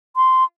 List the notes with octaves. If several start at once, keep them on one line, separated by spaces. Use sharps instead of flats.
C6